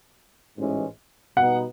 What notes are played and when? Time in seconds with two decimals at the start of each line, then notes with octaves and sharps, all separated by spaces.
0.58 A1 G#2 E3 G#3 C#4
1.37 B2 G3 B3 D#4 F#5